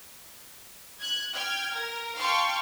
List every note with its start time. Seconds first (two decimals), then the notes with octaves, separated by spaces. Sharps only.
1.00 F#6 G#6
1.33 G5 F6 G#6
1.75 A#4
2.17 F5 G5 A5 C6 C#6 F6